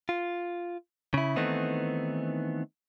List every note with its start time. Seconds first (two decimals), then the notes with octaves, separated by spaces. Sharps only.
0.09 F4
1.14 C#3 E4
1.36 D#3 E3 A3 B3 C4 D#4